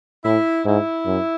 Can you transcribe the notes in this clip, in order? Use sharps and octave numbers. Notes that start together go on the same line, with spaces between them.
A2 E4
G#2 E4
F#2